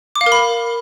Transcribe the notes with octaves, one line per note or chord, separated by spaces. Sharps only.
D6
F5
A#4
B5